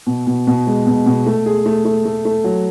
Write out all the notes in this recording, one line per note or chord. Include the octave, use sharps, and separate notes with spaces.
B2
B2
B2
G#3
B2
B2
A3
G#4
A3
A3
A3
A3
F#3